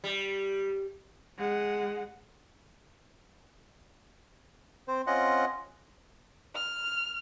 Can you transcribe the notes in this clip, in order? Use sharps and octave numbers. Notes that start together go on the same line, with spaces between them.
G3
G#3 F#5
C4 C5
C4 C#4 F4 D#5 F#5
F6